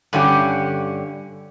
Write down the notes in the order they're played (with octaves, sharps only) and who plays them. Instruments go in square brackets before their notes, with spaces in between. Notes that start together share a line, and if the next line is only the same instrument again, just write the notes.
[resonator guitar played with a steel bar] G2 D3 C#4 G4